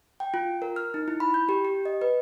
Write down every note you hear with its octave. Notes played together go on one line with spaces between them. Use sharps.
G5
F4
A#4
F6
D#4
E4
B5
G6
G4
G4
D#5
B4